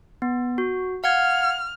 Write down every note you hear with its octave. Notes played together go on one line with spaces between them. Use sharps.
B3
F#4
F5 F#5 F6 G#6